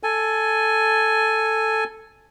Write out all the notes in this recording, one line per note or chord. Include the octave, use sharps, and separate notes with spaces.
A4 G#5